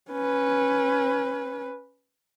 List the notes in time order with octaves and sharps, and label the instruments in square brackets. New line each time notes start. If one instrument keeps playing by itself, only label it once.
[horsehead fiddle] C#4 B4